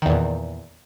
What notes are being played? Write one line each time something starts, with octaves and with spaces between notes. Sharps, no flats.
E2 A#2 D#3